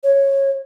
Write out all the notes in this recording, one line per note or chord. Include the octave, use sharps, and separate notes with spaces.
C#5